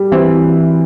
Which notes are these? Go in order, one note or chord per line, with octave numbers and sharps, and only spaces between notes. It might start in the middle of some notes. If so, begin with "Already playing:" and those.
Already playing: G3
E3 C4